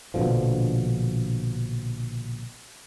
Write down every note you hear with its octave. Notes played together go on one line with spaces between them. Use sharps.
A#1 B2 D3 F3